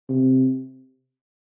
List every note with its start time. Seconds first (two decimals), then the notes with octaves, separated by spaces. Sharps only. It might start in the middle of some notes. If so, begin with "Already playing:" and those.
0.09 C3